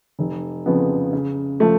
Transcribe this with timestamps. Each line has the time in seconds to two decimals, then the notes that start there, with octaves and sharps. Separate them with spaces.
0.19 F1
0.66 F2 C#3 F3 B3
1.13 C#3
1.60 F3 A3